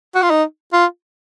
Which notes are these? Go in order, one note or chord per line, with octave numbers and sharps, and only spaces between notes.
F#4
F4
D#4
F4